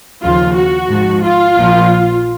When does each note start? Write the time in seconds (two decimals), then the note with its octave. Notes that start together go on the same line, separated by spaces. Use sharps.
0.22 D#2 C#3 F3 F4
0.56 F#4
0.89 G#1 G#2 F3
1.22 F4
1.56 A#1 A#2 F3